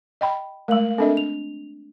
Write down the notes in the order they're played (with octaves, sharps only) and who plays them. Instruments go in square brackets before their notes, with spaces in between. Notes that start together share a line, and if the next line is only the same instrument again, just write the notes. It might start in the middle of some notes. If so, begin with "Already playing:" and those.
[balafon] D#5 G5 B5
[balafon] G#3 A3 [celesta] A#4 F5 F#7
[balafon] C4 D4 D#5 [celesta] A4 A#4 E5
[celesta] F7